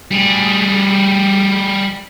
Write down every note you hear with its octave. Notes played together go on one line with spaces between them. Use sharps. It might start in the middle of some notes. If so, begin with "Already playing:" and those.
G3 G#4